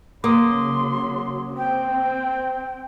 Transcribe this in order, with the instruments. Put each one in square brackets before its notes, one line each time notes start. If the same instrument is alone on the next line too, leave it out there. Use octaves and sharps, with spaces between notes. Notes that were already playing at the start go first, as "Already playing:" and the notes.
[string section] C#3 F#3 [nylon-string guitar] A#3 [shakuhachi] C6 [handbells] D6 D#6
[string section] C4 [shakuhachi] G5